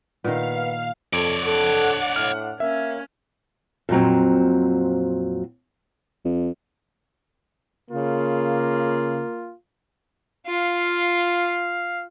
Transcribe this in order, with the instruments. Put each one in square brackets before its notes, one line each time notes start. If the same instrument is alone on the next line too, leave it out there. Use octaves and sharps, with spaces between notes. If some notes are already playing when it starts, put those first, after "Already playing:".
[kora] A#2 D#3 [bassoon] B3 [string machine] F5
[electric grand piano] F2 [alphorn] A4 [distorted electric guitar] C#5 D5
[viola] D4 F#5 [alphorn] A4
[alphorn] A2 [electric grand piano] F6
[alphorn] A#3 [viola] C#4 [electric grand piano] E5
[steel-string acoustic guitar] F2 A#2 D#3 F#3 C4
[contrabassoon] F2
[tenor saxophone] C#3 [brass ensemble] A#3 F4
[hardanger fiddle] F4 [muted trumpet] F5